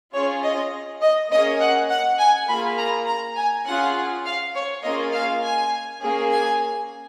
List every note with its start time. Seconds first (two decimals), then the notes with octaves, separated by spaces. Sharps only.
0.13 C#4 F4 G#4 C#5
0.42 D#5
1.02 D#5
1.31 A#3 C#4 G#4 D#5
1.60 F#5
1.90 F#5
2.19 G#5
2.48 A#3 F4 G#4 B5
2.77 A#5
3.07 A#5
3.37 G#5
3.66 C#4 F4 G#4 F#5
4.25 F5
4.54 C#5
4.83 A#3 C#4 F4 G#4 D#5
5.13 F5
5.42 G#5
6.02 A#3 C#4 G#4
6.30 G#5